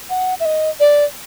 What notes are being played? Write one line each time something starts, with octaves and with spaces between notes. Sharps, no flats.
F#5
E5
D#5
D5